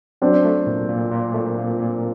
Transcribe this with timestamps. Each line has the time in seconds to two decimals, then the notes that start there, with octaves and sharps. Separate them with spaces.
0.22 F#3 C4 D4
0.45 A3
0.67 A#2
0.89 A#2
1.12 A#2
1.34 A3
1.57 A#2
1.79 A#2